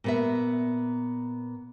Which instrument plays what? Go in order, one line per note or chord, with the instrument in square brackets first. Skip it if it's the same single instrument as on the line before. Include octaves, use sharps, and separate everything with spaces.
[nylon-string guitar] A#2 B3 E5